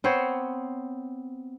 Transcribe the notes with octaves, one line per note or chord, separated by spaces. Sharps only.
B3 C4 C5 C#5